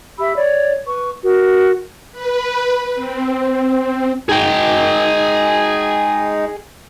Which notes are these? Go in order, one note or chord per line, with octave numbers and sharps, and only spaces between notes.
G4 E5 B5 E6
C#5 D5
B4 C#6
F#4 A#4
B4
C4
G#3 D#4 G#4 G5